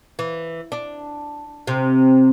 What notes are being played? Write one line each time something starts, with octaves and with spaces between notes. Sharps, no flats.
E3
D4
C3